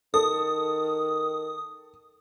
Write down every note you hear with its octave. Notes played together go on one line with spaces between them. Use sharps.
D#3 A4 D#6